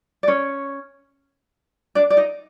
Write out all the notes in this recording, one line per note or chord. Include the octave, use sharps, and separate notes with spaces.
D5
C#4 C#5
D4 D5
D5
D#4 D#5